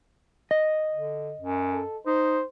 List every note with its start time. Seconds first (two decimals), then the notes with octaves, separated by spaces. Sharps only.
0.51 D#5
0.93 D3
1.40 F#2
1.73 A4
2.06 D#4 C5